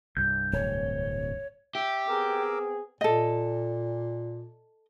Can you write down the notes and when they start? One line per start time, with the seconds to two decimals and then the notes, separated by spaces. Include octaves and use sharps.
0.17 C2 G2 G6
0.53 D1 C#5
1.75 G4 E5
2.08 B3 C4 G#4 A#4 D6 E6
3.01 A#2 A4 D#5